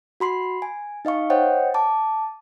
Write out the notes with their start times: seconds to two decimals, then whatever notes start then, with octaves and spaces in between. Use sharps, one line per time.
0.20 F#4 B5 C6 C7
0.62 G#5
1.05 D#4 D#5 F5 C#6
1.30 C5 C#5 D#5 F#5 G5
1.74 A5 D6